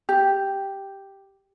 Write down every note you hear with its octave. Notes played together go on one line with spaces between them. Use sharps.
G4